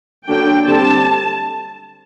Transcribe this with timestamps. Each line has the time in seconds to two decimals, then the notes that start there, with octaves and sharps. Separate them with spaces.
0.27 D3 F#3 A#3 D4 G5
0.66 D3 G3 C4 A5